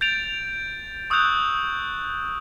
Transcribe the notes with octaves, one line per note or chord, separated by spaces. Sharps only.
G6 A6 D7 F7
C#6 D#6 E6 F#6 G6 F7